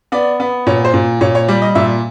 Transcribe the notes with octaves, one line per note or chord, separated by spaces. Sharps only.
B3 D5
B3
A#2 C#5
C5
A#2
A#2 C#5
C#5
G3 D5
D#5
A#2 E5